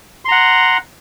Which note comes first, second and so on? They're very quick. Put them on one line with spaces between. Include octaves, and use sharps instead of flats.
C6 A#5 F#5